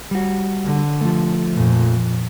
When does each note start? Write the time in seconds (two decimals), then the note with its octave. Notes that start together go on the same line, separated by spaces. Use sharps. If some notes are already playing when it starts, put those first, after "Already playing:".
0.11 G3 F#4
0.64 D3
1.01 F3 A3
1.52 F2 A#2